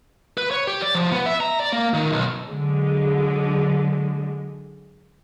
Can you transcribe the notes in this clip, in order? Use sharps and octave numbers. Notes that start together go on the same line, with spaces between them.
B4
C#5
G4
D5
F3
B3
E5
A#5
D5
A#3
D#3
B1
D3 F#3 G#3